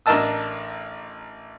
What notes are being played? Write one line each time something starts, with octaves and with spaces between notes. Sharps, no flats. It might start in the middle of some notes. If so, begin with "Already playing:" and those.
A1 D4 A#4 D#5 A5 E6